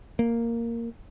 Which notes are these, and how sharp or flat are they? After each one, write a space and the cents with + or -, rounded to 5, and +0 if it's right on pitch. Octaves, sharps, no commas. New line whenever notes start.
A#3 -5